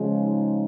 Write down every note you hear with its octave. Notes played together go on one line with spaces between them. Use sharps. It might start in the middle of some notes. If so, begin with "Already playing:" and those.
Already playing: C#3 F3 G#3
D#4